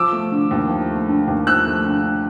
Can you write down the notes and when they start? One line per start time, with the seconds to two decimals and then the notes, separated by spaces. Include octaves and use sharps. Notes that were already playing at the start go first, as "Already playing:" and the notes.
Already playing: F3 D6 E6
0.12 A3
0.32 D3
0.51 D#2
0.69 F3
0.90 A3
1.09 D3
1.28 D#2
1.47 F3 E6 F#6
1.66 A3
1.85 D3